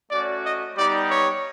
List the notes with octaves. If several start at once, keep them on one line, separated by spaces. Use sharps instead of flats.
A3 C#4 F#4 D5
D#5
G3 B3 D#4 G4 D5
C#5